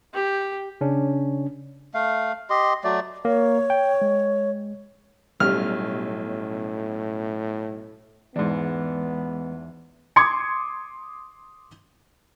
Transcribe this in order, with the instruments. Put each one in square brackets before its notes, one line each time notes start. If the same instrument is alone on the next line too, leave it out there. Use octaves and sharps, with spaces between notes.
[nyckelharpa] G4
[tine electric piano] C#3 C#4 D4
[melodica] A3 F5
G4 D#5 C6
F#3 A3 D5
[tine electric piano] A#3 [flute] C#5
[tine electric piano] G5
G#3
[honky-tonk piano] B1 C#4 [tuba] A2 [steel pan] G3 [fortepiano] F6
[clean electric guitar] E2 [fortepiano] G#2 D4 [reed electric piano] E3 G#3 [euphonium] B3
[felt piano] C6 D6 D#6 G#6 C#7